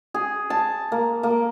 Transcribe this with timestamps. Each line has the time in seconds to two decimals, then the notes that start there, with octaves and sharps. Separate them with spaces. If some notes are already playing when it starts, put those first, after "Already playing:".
0.14 G#4
0.50 A5
0.92 A#3
1.23 A#3